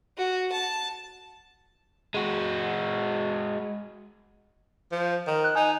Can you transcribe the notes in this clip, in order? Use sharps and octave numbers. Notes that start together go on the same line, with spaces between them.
F#4
A5
G#3 F#4
F3
D#3
F#6
D#4 G#5